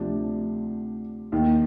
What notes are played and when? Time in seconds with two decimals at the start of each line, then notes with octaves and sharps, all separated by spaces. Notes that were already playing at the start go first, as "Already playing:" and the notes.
Already playing: D2 C3 F3 D4
1.32 D#2 D#3